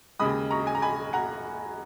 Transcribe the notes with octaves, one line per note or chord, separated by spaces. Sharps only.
D#2 C#3 G#3 B5 D#6
A#5 C#6
G#5
A#5
G#5 B5
F#5 A#5